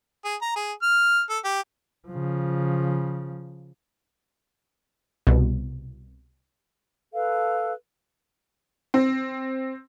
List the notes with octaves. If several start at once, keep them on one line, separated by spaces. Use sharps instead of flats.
G#4
A#5
G#4
F6
A4
G4
C#3 F3
C2 B2
A4 B4 F5
C4